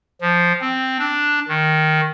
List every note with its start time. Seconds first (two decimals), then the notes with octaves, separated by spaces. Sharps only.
0.21 F3
0.61 C4
0.99 D4
1.48 D#3